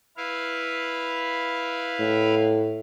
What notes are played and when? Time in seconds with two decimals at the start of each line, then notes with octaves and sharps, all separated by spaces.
0.17 E4 B4 F5
2.00 A2